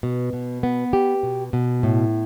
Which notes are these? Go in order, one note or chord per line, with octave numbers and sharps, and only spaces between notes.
B2
B2
B3
G4
B2
B2
A2